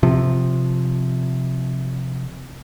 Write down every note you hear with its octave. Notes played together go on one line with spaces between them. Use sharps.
C3 F3